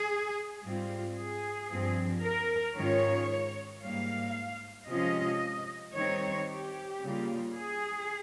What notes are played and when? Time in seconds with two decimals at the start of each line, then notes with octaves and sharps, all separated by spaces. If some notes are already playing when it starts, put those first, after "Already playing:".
Already playing: G#4
0.64 G#2 G3 C4 F4
1.17 G#4
1.70 G2 F3 C4
2.24 A#4
2.76 G#2 D#3 G#3 C#4 F4 C#5
3.82 G#2 G3 A#3 F5
4.88 C3 F3 G#3 C#4 F4 D#5
5.94 D#3 G3 C4 D#4 C#5
6.48 G4
7.01 C#3 G3 A#3 F4
7.54 G#4